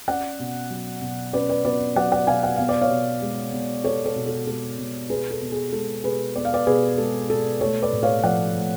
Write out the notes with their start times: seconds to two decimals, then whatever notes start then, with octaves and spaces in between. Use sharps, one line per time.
0.08 C#4 D5 F#5
0.39 B2
0.70 F#3
1.02 B2
1.33 C#4 B4 D5
1.49 B4 D5
1.65 B2 B4 D5
1.96 F#3 D5 F#5
2.12 D5 F#5
2.27 B2 F5 G#5
2.43 F#5
2.56 B3 F5
2.69 D5
2.81 C#5 F5
2.90 B2
3.22 G#3
3.53 B2
3.84 B3 A4 C#5
4.06 A4 C#5
4.16 B2
4.26 A4
4.47 G#3 A4
4.79 B2
5.10 B3 G#4 B4
5.31 A4
5.42 B2
5.52 G#4
5.72 G#3 A4
6.04 B2 G#4 B4
6.35 B3 D5
6.45 F5
6.54 B4 D5
6.67 B2 G#4 B4
6.98 G#3 A4
7.30 B2 A4
7.61 A3 A4 C#5
7.82 B4 D5
7.93 A2
8.03 C#5 F5
8.24 F3 D5 F#5
8.55 A2